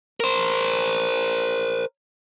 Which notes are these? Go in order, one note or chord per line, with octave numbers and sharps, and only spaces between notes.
A#4 C5